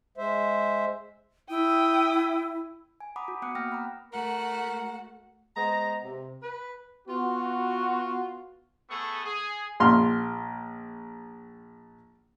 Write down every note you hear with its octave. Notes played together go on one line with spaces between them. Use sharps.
G#3 C5 E5
E4 G5 D#6
G#5
F#5 A#5 B5 D6 D#6
F#4
B3 F#5 D6 D#6 F#6 C#7
A#3 G5 F6 A#6
A#5 B5
A3 F#4 A#4 F#5
G#3 B3 C5 A#5
C3
B4
B3 F4 F#4
A3 B3 G#4 A4 C#6
G#4
A#1 C6 F6